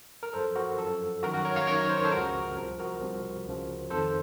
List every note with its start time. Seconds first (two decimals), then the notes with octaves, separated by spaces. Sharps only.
0.23 A#4
0.33 F#2 F3 A4 C5
0.56 F#4 A#4
0.78 F#2 F3 A4
1.23 F#2 D#3 F#4 A#4
1.34 F#4 A#4
1.45 A#4 C#5
1.56 C#5 F5
1.67 F#2 D#3 A#4 C#5
1.89 C5
1.97 C#5
2.04 A4 C5
2.12 C#2 C#3 F3 F#4 A#4
2.57 C2 C3 F3
2.79 F#4 A#4
3.01 C2 C3 F3
3.46 C#2 C#3 F3
3.90 F2 D#3 A4 C5